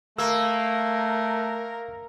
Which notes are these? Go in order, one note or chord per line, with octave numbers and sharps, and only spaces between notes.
A3 A#3 A#4 E6